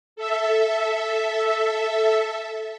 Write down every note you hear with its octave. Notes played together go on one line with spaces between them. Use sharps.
A4 E5